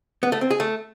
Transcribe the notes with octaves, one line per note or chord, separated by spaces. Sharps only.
B3
A3
C4
G#4
A3